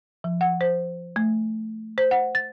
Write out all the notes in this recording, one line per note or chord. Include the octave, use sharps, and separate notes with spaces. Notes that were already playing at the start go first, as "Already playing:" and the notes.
F3
F#5
C5
A3
C5
F#5
A6